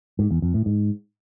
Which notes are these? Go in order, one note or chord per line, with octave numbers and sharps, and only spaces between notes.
G#2
E2
F2
A2
G#2